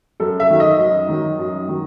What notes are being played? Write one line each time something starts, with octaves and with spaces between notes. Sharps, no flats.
F#2 A4
E5
D#3 F#3
D#5
F#2
D#3 F#3
F#2
D#3 F#3